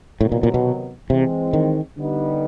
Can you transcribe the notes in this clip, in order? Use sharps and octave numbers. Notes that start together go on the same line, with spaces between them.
A2 C3 D#3 F#3 B3
A#2
A#2
B2
C3 E3 G#3 C4
D#3
D3 G3 B3 D#4